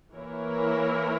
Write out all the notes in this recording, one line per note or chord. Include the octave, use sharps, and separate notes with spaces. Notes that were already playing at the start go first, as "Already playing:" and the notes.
E3 A#3 E4 A#4 C#5